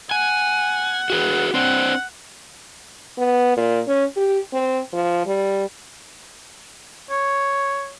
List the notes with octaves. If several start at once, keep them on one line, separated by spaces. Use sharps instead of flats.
F#5 G#5
F#4 G#4 B4
C4 D4 C5 F#5
B3
A#2
C#4
G4
C4
F3
G3
C#5